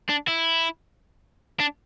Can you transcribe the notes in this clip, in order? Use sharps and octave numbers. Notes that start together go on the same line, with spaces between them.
D4
E4
D4